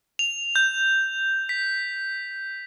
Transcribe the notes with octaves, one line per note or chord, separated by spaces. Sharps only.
F7
G6
B6